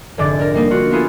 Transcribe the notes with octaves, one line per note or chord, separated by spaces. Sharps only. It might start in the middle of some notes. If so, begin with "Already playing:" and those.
F1 G#2 D3 D6 A6
D4 A#4
G3 A#3 D#4
D#4 F4 F#4
B3 E4 F4 G#4 A4